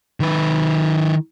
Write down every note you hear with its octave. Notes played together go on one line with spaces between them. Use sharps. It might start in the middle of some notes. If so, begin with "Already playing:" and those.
D#3 B4